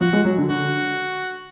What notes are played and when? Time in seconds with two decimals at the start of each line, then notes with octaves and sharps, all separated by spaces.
0.01 F3 F#4
0.13 G#3
0.24 F#3
0.37 D3
0.49 D3 F#4